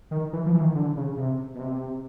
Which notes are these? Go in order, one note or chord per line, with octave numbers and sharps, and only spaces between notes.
D#3
E3
F3
E3
D#3
D3
C#3
C3
B2
C3